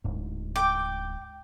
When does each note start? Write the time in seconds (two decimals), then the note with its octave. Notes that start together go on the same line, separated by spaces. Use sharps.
0.04 D1 G#2
0.56 G5 D6